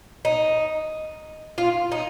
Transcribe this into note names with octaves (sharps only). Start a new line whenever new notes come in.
D#4
F4
D#4